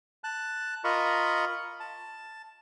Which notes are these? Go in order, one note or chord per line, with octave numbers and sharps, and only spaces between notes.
A5 F#6
F4 A#4 D#5 B5 C#6
A5